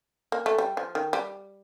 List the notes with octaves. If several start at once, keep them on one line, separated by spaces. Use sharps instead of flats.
A#3
A3
G3
F3
D#3
G3